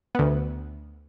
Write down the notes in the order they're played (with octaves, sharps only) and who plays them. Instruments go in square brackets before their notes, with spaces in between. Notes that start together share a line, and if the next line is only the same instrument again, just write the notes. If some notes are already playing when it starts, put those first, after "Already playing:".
[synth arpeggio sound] D2 B3